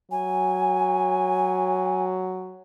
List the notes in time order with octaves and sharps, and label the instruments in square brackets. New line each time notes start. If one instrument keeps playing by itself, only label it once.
[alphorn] F#3 [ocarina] G#5